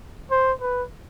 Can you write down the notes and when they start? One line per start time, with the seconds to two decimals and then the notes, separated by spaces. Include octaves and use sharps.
0.31 C5
0.61 B4